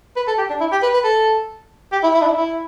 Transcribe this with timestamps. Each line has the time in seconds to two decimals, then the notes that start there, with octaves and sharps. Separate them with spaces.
0.16 B4
0.27 A4
0.38 G4
0.50 D4
0.60 E4
0.72 G4
0.82 B4
0.93 B4
1.04 A4
1.92 G4
2.03 E4
2.14 E4
2.22 D4
2.26 E4
2.37 E4